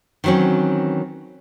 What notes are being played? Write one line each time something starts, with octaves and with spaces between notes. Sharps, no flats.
D#3 E3 F#3 C4 C#4